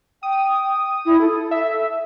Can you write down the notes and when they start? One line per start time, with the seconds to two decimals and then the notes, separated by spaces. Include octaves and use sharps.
0.23 G5 D#6
1.06 E4
1.21 A4
1.51 E5